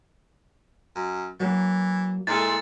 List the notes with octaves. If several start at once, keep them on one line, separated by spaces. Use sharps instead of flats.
F#2
E3 F#3 A#3
A#2 G#3 E4 A4 A6